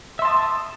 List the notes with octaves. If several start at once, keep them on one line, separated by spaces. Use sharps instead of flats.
E5 A5 C6 D#6